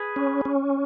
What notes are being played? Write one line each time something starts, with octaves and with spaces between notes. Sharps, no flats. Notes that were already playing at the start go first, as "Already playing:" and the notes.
Already playing: G#4 B4
C#4
C#4